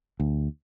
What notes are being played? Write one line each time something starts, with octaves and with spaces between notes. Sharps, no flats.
D2